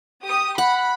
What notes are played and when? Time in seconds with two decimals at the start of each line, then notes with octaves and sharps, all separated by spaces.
0.22 G4 D#6
0.58 F#5 B5